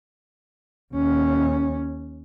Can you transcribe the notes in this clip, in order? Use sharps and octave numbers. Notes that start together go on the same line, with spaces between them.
D#2 C#4